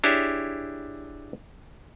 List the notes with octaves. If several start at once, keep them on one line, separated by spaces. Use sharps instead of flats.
D4 E4 G4 G#4 C#5 E5